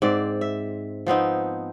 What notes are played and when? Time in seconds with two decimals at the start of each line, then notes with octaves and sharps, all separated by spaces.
0.02 G#2 C4 D5
0.41 E5
1.07 F3 B3 C4 D#4